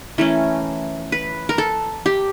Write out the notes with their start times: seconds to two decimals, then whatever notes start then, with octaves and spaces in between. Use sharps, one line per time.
0.18 E3 A3 C#4 A#4
1.12 B4
1.49 A#4
1.58 A4
2.06 G4